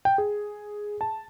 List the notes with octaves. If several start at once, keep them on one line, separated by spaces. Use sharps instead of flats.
G5
G#4
A5